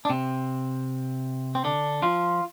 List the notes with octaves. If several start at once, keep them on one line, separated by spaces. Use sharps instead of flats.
D4
C3 C4
C4
D3 D4
F3 F4